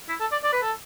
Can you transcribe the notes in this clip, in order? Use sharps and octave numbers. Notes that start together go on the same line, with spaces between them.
E4
A4
D5
D5
B4
A4